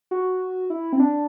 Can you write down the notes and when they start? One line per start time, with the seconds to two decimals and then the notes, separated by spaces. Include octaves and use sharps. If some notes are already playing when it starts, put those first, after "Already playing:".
0.11 F#4
0.70 E4
0.93 C4
1.00 D4